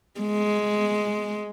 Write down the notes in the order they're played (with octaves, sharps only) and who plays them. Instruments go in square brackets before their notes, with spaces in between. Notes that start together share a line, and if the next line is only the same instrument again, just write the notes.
[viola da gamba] G#3